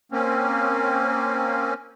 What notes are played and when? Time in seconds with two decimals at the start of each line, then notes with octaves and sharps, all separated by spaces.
0.12 A#3 C4 C#4